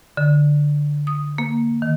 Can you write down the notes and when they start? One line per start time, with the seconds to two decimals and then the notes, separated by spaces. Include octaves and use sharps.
0.17 D3
1.07 D#6
1.38 A#3
1.82 D#3